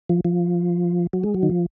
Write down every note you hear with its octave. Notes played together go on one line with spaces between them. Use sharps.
F3
F3
F#3
G#3
F#3
D#3
F3